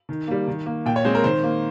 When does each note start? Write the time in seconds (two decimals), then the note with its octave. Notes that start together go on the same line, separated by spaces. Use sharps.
0.09 D#3
0.27 G3 A#3
0.48 D#3
0.66 A#3
0.85 A#2 G5
0.96 C#5
1.05 G#3 C4 C5
1.15 A#4
1.24 D#3 C5
1.43 A#3